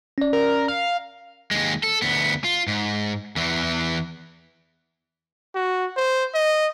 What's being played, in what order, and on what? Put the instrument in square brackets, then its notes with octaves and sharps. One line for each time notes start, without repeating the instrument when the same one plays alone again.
[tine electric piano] C#4 D5
[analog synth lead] A#4
F5
[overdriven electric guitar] D#2 G#3
A4
D2 B3
F4
G#2
E2 E3
[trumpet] F#4
C5
D#5